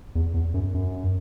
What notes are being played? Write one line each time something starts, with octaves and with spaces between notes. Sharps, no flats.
E2
E2
F#2
F#2